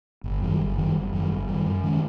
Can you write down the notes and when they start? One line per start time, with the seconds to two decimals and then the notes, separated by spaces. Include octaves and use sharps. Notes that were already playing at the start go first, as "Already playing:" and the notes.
0.24 G1
0.42 F#2 D#3 G3
0.60 G1
0.77 F#2 D#3 G3
0.95 G1
1.13 F#2 D#3 G3
1.30 G1
1.48 F#2 D#3 G3
1.66 F#2
1.84 D#3 G#3 C#4